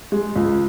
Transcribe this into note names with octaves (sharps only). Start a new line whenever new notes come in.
G#3
C#2